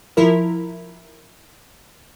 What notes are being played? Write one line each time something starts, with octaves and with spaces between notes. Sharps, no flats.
F3 E4 A#4